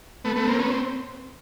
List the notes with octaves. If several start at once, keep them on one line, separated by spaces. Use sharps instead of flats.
A3 B3
A3 B3
A#3 C4
B3 C#4
C4